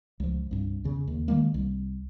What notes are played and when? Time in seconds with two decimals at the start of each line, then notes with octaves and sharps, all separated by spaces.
0.20 C#2 F3
0.51 C2 G2
0.84 E2 C#3
1.07 D#2
1.28 D#3 G#3 A#3
1.54 C2